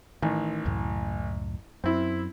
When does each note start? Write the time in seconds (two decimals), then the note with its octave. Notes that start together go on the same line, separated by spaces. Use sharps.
0.22 A1 D#3
0.65 C#2 F#2 A2
1.84 F#2 C4 E4